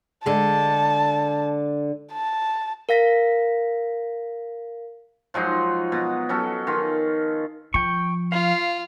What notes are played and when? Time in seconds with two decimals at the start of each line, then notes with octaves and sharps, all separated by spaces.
0.26 D3 G#3 A5
2.13 A5
2.89 A#4 F5 A#6 B6
5.34 F3 F#3 G#3 D#4
5.92 B2
6.29 F#3 C#4 A4
6.67 D#3 F4
7.74 F3 G5 C#6
8.32 F4 F5